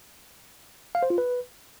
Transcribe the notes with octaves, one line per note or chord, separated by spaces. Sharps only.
F5
C5
F4
B4